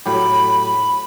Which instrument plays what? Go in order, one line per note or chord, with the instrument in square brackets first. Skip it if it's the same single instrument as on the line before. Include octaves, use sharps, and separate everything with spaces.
[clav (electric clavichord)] A2 F#3 G4 [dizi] B5
[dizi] B5